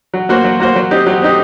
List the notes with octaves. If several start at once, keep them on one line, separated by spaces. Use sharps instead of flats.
F#3
A#3 F#4 C5
F#3
A#3 F#4 C5
F#3
C4 D#4 G4
F#3
C4 D#4 G4